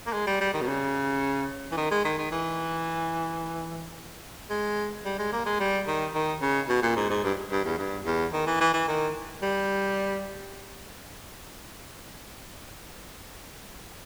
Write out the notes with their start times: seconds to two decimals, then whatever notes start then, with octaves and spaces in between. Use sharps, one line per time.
0.07 A#3
0.13 G#3
0.27 G3
0.40 G3
0.54 D#3
0.61 B2
0.68 C#3
1.72 E3
1.77 D#3
1.91 G#3
2.05 D#3
2.18 D#3
2.31 E3
4.50 G#3
5.05 G3
5.19 G#3
5.32 A#3
5.46 G#3
5.60 G3
5.87 D#3
6.14 D#3
6.41 C#3
6.69 B2
6.83 A#2
6.96 G#2
7.10 G#2
7.24 G2
7.51 G2
7.65 E2
7.78 G2
8.06 E2
8.33 D#3
8.47 E3
8.61 E3
8.74 E3
8.88 D#3
9.42 G3